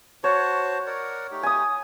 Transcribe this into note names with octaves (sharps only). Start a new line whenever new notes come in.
F#4 C5 C#5 A5
A#4 D5 F#5
A3 D#4 G4
G#5 D#6